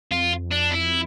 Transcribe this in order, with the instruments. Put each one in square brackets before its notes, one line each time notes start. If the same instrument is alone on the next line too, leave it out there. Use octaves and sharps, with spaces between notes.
[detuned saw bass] F2 [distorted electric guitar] F4
[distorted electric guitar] D4
E4